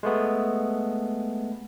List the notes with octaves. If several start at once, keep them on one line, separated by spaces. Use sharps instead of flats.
G#3 A3 B3